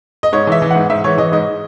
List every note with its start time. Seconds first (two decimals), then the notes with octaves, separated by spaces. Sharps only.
0.23 D#5
0.33 G#2 C#5
0.47 E3 E5
0.62 E3
0.71 G#2 F#5
0.90 G#2 E5
1.04 E3 C#5
1.18 E3 D#5
1.32 G#2 D#5